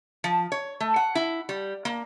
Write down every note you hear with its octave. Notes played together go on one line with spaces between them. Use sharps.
F3
C#5
A3
F#5
E4
G3
A#3